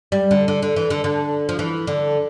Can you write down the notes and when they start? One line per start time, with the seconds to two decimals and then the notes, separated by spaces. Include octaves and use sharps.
0.12 G3
0.31 D3
0.48 D3
0.63 D3
0.76 E3
0.90 D3
1.04 D3
1.49 F3
1.59 E3
1.87 D3